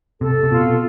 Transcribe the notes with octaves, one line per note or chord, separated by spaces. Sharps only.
C3 A4
C3
B2 F4